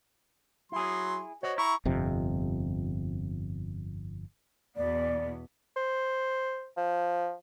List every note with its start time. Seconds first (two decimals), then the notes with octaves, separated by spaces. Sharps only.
0.72 F#3 E4 G#4 C6
1.43 F#4 C5 C#5 D#5
1.58 E4 A#5 C#6
1.85 G1 F2 C3
4.76 E2 B2 B3 D5
5.77 C5
6.77 F3